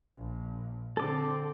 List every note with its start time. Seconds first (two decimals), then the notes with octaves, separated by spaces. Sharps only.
0.17 A#1
0.97 D3 C4 A4 D6